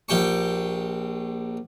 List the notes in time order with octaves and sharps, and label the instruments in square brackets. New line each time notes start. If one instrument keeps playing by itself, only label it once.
[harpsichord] A#1 G4 G5 C#6